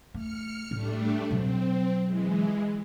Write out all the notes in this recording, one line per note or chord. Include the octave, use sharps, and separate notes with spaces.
A3 F6 C#7
A2 G3 A3 D4
B2 F#3 C4
E3 G#3